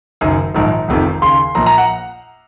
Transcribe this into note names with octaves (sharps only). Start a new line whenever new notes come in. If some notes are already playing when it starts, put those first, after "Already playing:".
F#1 F#2 D#3
A#1 G#2 D#3
F1 F2 C3 D#3
D#2 C#3 C6
A#1 A#2 A#5
A#5
F#5